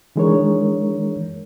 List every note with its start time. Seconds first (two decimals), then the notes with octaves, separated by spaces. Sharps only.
0.16 D#3 E3 G#3 D4 A#4 C#5